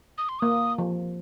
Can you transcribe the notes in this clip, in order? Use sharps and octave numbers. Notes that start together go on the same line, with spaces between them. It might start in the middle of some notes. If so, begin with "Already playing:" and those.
D#6
C6
A#3 D#6
F3